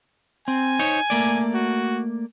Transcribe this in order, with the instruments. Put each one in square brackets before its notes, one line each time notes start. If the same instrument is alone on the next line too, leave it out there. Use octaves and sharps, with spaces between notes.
[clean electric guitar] C4 [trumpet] G#5
[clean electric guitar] D#4 C5 C#5
A3 A#3 D5
[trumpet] F#4